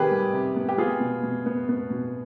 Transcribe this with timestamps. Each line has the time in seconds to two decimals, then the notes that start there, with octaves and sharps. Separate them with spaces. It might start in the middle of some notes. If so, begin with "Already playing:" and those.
Already playing: C3 D#3 B3 G4 G#4 B4
0.11 G3
0.33 C3
0.56 B3
0.69 G4
0.78 B3 F4 G#4
1.00 B2
1.23 B2
1.46 B3
1.69 B3
1.90 B2